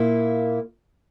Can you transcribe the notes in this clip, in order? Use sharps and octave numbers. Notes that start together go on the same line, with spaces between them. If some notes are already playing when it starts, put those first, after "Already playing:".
Already playing: A#2 A#3 E4